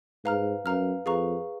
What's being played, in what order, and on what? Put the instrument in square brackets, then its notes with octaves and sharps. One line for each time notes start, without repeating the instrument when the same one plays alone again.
[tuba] G#2 [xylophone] B4 F5 A#5 F6
[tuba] F#2 [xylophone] B4 F5 A#5 F6
[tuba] F2 [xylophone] G#4 B4 F5 A#5 C#6